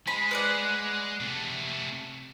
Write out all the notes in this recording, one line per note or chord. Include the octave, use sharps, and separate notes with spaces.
G#3 B5
B4 D5 F#5
C3 A3